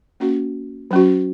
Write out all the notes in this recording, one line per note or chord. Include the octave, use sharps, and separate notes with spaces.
A#3 C#4 F#4
F#3 C#4 F#4